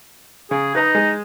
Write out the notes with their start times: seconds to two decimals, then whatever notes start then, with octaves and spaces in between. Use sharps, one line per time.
0.51 C#3 G#4
0.75 D#4 B4 D#5 A#5
0.95 G#3